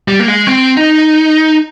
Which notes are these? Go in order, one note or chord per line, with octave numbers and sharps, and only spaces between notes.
G3
A#3
G#3
C4
D#4